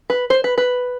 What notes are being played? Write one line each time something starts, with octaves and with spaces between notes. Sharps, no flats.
B4
C5
B4
B4